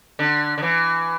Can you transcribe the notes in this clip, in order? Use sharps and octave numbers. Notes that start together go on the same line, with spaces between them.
D3
D3
E3